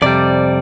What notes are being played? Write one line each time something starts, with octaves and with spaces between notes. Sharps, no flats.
F2 C3 G3 D5